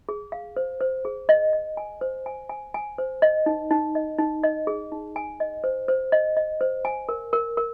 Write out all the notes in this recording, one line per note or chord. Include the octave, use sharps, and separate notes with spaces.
G#4
F5
C5
C5
G#4
D#5
D#5
G#5
C5
G#5
G#5
G#5
C5
D#5
D#4
D#4
D#5
D#4
D#5
G#4
D#4
G#5
D#5
C5
C5
D#5
D#5
C5
G#5
A#4
A#4
A#4